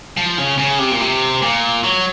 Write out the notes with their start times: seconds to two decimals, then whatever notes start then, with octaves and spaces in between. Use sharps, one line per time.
0.17 F3
0.38 C#3
0.58 C#3
0.79 C3
0.92 A#2
1.01 C3
1.42 A#2
1.84 F#3